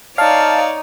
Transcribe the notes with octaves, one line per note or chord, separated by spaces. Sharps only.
D#4 C#5 D5 F5 A5